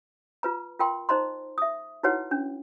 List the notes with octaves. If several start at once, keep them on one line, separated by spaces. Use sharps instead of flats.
F4 B4 A#5
F4 A#4 G5 C6
D#4 C5 D#5 A#5 C6
E5 D#6
D#4 E4 F#4 B4 C#5 F#5
C#4 D4